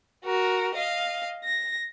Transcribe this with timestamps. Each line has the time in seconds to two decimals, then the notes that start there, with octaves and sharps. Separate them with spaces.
0.25 F#4 A#4
0.75 D#5 F5
1.44 A#6